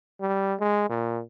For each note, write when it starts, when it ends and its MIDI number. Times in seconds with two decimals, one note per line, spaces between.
0.21 0.54 55
0.60 0.85 56
0.89 1.21 46